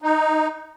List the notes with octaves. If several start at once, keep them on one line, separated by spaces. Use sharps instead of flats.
D#4